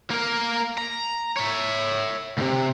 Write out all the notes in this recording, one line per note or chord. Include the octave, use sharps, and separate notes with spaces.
A#3 A#4
A#5
C#5 E5
D2 C3